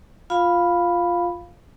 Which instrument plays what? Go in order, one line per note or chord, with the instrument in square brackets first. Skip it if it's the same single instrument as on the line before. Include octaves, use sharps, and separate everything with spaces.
[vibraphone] F4 F5 B5